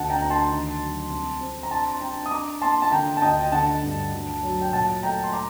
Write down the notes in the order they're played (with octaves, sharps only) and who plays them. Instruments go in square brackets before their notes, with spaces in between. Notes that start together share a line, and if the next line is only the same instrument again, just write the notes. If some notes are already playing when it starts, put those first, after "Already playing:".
Already playing: [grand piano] D2 F#5 A5
G5 A#5
D2 A#5
A5 C6
D#3
F#3
C2
C4
A#5
D4 A5 C6
C6
D4 G5 A#5
D#6
D4 A#5 D6
A#3 A5 C6
A5
D3 G5 A#5
A5
D2 D#5 G5
G5
D3 F#5 A5
G2
D2
F#3
G5
A#2 F#5 A5
A3 G5 A#5
C6
A#5 D6